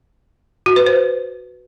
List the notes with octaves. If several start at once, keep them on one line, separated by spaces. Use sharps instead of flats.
F#4
B4
C5